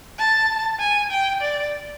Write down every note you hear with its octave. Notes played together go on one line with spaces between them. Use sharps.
A5
G#5
G5
D5